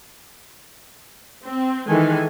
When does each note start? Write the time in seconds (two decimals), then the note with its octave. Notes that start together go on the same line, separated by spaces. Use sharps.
1.43 C4
1.87 D#3 E3 G#3 A4 G#5